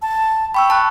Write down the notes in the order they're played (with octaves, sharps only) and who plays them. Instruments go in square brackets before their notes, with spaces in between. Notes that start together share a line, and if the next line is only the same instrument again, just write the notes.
[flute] A5
[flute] G5 [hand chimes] B5 C#6 E6
[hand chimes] A5 C#6 F#6